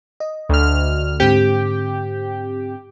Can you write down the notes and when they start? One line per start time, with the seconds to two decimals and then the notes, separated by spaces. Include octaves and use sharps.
0.20 D#5
0.49 D2 F6
1.20 G#2 D3 C4 G4